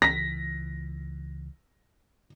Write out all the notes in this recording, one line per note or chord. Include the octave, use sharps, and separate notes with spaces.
C#2 E3 A#6 B6